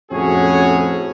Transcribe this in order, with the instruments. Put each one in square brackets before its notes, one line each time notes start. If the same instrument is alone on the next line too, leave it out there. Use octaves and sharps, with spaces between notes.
[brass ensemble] F2 A2 C#4 F#4 G#4 C#5